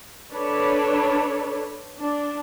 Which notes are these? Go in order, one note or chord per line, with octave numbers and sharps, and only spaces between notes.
D4 A4 B4 C#5
D4